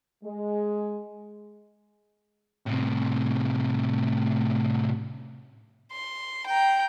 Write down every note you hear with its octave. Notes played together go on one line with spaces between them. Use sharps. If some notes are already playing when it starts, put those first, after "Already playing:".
G#3
A2 C3
C6
G5 A#5